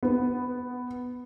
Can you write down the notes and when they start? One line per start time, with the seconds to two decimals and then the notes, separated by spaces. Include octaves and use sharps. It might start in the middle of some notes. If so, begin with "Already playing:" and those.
0.03 B3